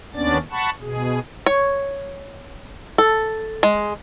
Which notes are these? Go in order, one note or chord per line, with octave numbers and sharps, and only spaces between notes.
D#2 B3 C#4 D4 D5 A6
F#5 A5 B5 C#6
B2 G#4
C#5
A4
G#3